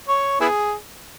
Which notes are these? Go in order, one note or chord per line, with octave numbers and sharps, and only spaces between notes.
C#5
B3 E4 G#4